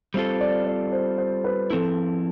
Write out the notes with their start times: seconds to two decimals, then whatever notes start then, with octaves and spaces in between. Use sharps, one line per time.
0.14 G3 C4 F4 A4 C5
0.41 D5
0.67 D5
0.92 C5
1.18 C5
1.44 B4
1.70 F3 C4 E4 A4